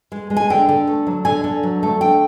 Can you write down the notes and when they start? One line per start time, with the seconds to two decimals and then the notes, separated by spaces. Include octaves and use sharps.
0.12 G#3
0.30 G#3
0.37 G#5
0.50 D3 G5
0.69 D3
0.87 A3
1.07 F#3
1.25 D3 G#5
1.44 D3
1.63 F#3
1.83 A3
2.01 D3 G5